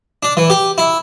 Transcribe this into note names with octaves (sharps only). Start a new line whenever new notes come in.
D4
E3
G4
E4